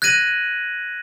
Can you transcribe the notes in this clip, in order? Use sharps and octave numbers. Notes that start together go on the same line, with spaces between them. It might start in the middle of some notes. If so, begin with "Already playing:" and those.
F#6 G#6 A#6 D#7 F#7